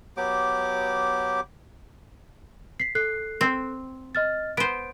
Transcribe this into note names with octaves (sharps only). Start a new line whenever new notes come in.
F#3 B3 G4 D6
B6 C7
A4 F#6 C7
C4
D#5 F6 A6
B3 C5 D7